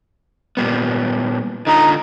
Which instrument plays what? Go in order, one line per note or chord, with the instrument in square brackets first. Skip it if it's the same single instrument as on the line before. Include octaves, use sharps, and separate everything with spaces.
[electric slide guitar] A#2 G3 B3
[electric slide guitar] D3 F4 A#5 [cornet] D#4